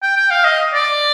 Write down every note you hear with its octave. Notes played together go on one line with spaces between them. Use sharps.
G5
G5
F5
D#5
D5